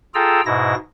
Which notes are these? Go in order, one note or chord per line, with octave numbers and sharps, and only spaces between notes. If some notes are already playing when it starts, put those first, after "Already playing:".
F4 G#4 A4 G5 A#5 E6
G#2 B2 E4 A#6